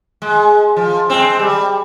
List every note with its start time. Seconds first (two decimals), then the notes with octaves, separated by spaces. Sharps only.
0.22 G#3
0.76 F3
1.10 G#3 C4
1.39 G3